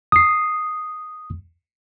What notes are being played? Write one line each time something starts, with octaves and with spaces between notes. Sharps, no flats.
D#6 C7